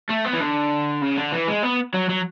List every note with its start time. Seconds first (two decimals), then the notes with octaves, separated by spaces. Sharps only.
0.10 A3
0.26 B3
0.34 E3
0.41 D3
1.02 C#3
1.18 D3
1.32 E3
1.48 G#3
1.63 B3
1.94 F#3
2.09 F#3